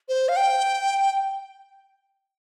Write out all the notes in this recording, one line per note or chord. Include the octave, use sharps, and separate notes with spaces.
C5
F5
G5